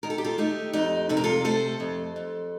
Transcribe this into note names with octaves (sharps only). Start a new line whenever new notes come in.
D#3 A#4
A4
G4
F4 A4
A3 D#4 G4
F2 D#4 G4
C3 A4
A#4
F4 A4
A3 A4 C5
F2
F2